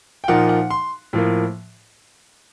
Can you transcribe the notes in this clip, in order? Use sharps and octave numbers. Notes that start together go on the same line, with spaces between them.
G5
A#2 F3 A#3 D#4 F#5
F#5
C6
A2 F3 A#3